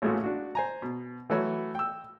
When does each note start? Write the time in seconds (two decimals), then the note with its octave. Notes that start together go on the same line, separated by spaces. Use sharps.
0.02 A1 A#2 G#3 A3 F#4
0.24 D4 F#4
0.55 C5 G#5 A#5
0.82 B2
1.30 E3 F#3 A3 F#4 C#5 B5
1.75 G5 E6